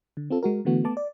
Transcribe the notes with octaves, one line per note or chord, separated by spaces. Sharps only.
D3
C4 F4 A4
G#3 F#4 A#4
D3 E3 A3 B3 F#4
A3 B3 A5 D6
D5